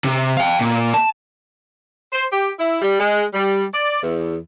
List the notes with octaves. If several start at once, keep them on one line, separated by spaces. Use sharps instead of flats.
C3
F5 G5
A#2
A5
C5
G4
E4
G3
G#3
G3
D5
E2